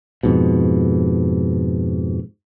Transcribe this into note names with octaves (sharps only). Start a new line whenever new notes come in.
F2 G#2 B2